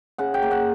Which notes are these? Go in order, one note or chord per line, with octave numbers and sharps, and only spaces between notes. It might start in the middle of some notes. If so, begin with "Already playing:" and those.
C#3 F#5
G5
A#3
F#5